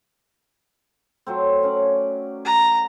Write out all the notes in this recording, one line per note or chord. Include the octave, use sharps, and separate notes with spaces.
F#3 A3 C4
C#4 D5
A#5